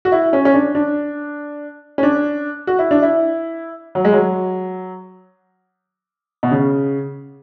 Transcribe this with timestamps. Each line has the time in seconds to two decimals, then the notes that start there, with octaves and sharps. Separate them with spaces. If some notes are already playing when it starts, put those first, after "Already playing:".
0.05 F#4
0.12 E4
0.33 C#4
0.45 C#4
0.54 D4
0.75 D4
1.98 C#4
2.03 D4
2.67 F#4
2.79 E4
2.91 D4
3.02 E4
3.95 F#3
4.05 G#3
4.13 F#3
6.43 B2
6.51 C#3